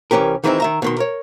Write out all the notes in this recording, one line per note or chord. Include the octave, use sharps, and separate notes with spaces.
C2 E3 C#4 G4 A#4
D#3 E3 G#3 C4 D#4 E4
D#3 E5 A#5
B2 D#3 C6
A#4 C#5